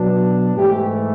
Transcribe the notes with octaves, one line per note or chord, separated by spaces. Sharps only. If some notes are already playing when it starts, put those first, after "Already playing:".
Already playing: B2 F#3 B3 D4
G#2 E3 A3 G4